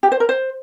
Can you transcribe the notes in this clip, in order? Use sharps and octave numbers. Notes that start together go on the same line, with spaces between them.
G4
C5
A#4
C5